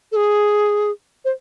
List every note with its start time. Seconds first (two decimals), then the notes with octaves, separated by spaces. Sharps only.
0.12 A4
0.16 G#4
1.25 C5